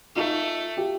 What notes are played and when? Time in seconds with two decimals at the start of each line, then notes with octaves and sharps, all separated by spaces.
0.16 A3 D#4 F4
0.77 F4 G4